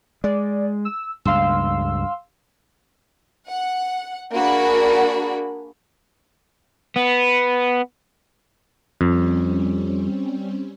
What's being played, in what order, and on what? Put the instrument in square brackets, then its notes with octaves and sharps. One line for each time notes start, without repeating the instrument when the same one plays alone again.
[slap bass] G#3 [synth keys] D5
[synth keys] E6
[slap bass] C#2 G2 [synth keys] F5 C6 E6
[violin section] F#5
A#3 D4 F#4 G#4 B5
[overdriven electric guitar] B3
[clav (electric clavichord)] F2 [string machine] G3 C4 C#4